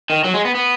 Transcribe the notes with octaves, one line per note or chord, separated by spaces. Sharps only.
D#3
F#3
G#3
B3
B3